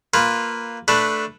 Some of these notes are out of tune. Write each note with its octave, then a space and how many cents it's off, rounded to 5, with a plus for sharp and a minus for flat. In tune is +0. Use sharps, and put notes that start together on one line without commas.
A#3 -5 F4 +0 B4 +0
A3 +0 D4 +0 B4 +0